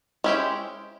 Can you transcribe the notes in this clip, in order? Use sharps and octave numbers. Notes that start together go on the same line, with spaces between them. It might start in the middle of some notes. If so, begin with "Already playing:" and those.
G#3 C#4 E4 G4 C5